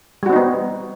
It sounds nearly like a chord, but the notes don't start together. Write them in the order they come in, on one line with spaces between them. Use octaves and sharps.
G3 F#4 C4 D#4 B3